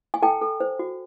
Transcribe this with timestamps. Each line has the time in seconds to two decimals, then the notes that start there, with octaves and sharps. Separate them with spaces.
0.14 G#5
0.22 A4 G5 A5
0.41 A4
0.60 C5
0.79 F#4